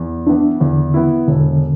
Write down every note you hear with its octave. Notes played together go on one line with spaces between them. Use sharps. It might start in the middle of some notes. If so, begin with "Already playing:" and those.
Already playing: E2
E3 B3 D4 E4
E2 D3
E3 B3 E4
E1 D3